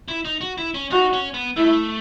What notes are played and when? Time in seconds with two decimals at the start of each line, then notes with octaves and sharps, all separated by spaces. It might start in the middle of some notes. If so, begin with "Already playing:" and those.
0.08 E4
0.25 D#4
0.41 F#4
0.58 E4
0.74 C#4
0.90 D#4 F#4
1.13 C#4
1.34 B3
1.56 A3 E4